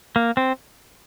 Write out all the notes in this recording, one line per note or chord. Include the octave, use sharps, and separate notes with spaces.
A#3
C4